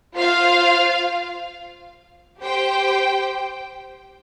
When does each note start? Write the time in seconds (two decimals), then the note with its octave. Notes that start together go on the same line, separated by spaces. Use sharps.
0.14 F4 C5 F5
2.42 G4 C5 G5